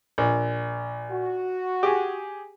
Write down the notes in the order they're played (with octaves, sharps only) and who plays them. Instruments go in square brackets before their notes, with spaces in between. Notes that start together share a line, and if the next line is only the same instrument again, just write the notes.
[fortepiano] A#1
[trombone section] F#4
[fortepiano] G4 G#4